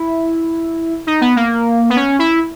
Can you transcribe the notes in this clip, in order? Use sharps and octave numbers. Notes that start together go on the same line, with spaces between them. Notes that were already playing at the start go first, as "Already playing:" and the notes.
Already playing: E4
D#4
B3
A#3
B3
C#4
E4